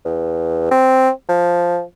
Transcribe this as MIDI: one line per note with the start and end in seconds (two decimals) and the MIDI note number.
0.05 0.67 40
0.71 1.10 60
1.29 1.83 53